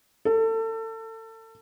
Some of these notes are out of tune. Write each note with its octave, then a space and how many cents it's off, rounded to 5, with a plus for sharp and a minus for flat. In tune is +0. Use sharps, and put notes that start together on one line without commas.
A4 +30